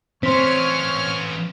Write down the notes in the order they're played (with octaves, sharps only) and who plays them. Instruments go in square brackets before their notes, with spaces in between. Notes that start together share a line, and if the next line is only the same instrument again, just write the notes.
[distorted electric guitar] E3 C#4 [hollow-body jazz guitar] C4 [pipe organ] C#5 F6 [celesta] C6 B6